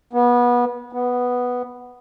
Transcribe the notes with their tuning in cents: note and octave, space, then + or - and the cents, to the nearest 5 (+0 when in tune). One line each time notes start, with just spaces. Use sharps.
B3 -25
B3 +0